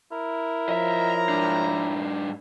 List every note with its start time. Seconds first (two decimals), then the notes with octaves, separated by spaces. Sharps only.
0.12 E4 A#4
0.69 F3 C#5 D#5 E5 A#5
1.29 G#2 D4